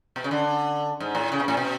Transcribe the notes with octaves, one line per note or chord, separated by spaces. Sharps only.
B2
C#3
D3
G#2
A2
C#3
B2
A2
B2